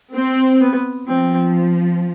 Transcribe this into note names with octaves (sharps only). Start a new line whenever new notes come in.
C4
B3
F3 C4